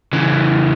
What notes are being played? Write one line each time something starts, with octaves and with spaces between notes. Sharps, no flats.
C#3 E3